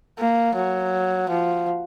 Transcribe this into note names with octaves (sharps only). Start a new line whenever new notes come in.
A#3
F#3
F3